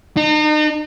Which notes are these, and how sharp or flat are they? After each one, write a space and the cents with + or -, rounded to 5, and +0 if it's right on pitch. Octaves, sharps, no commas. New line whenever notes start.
D#4 -40